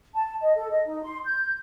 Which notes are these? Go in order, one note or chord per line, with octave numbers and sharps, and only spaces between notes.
A5
D#5
A4
D#5
D#4
C6
G6